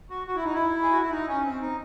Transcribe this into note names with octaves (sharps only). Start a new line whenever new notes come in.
F#4
F#4
E4
D#4
E4
G#4
F#4
E4
D#4
C#4
C4
D#4